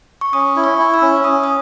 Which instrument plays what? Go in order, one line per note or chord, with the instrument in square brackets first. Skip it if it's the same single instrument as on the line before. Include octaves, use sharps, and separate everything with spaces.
[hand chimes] C#6
[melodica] C#4 [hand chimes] D#6
[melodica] E4
[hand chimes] C#6
[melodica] E4
[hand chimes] E6
[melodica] C#4
[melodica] C#4 [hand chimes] D#6
[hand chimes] D#6